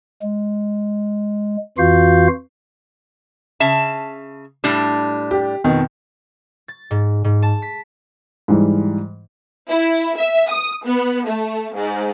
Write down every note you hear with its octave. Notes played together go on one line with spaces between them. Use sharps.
G#3
F2 E3 F4 F#4 F5 G6
C#3 E5 A5
A2 G3 D4
G4
F2 B2 D#3
A6
G#2
G#2
A5
B6
G#2 E3 G3
E4
E5
D#6
B3
A3
G#2